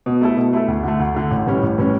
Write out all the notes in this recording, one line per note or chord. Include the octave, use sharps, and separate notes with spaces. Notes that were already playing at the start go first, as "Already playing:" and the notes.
B2
A3 E4 A4
B2
A3 E4 A4
D2
D3 A3
D2
D3 A3
A1
A2 E3 G3 C#4
A1
A2 E3 G3 C#4